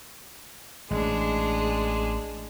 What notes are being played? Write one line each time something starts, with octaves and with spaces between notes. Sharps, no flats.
A1 G#3 D4